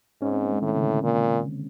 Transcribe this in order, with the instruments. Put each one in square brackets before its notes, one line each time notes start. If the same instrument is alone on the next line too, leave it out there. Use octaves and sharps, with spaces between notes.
[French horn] G#2 [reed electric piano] C#4
[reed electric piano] C4
A#3
G#3
[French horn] A2 [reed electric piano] D#3
[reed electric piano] C#3
D3
[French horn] A#2